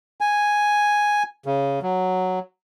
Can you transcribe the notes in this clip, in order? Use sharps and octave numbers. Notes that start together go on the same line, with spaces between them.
G#5
C#3
F#3